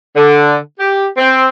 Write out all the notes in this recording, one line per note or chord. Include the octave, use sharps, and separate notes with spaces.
D3
G4
C4